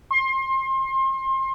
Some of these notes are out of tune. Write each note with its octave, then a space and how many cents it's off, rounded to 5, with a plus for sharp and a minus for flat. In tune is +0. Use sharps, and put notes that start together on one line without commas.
C6 +30